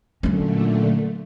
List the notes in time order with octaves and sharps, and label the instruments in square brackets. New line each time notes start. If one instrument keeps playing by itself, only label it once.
[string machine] A#2 D3 A3 [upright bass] F#3 C#4